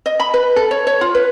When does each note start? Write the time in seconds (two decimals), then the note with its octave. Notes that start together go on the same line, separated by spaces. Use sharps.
0.06 D#5
0.20 B5
0.34 B4
0.56 A4
0.71 C#5
0.87 C#5
1.01 F4
1.15 B4